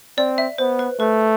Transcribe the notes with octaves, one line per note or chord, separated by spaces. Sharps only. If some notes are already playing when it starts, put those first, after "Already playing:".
C4 D5
E5
B3 C5
B4
A3 B4